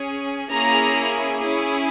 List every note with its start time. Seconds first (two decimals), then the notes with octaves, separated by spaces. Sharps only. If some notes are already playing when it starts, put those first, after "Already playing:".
Already playing: C#4 G#4
0.51 A#3 C#4 E4 G#4 A#5
1.41 C#4 E4 G#4